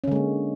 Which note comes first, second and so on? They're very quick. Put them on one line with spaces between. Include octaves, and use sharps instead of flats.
C#4 D3 G#3 A#3